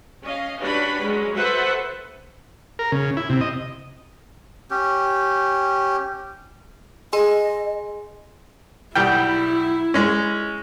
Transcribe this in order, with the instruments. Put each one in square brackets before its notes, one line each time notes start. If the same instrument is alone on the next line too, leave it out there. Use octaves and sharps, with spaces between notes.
[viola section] C#4 D#5 F5
C#4 D4 F#4 G4 B4 B5
F#3 G#3 C#4
F#4 A4 B4 C5 E5 F#5
[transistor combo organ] A#4
C#3
E4
C3
D#5
[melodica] C#4 G4
[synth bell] G#4 G#5 C6 [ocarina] D#5
[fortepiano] B1 G3 G5 [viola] E4
[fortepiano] G#3 C#4